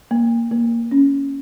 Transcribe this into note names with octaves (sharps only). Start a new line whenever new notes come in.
A#3
A#3
C#4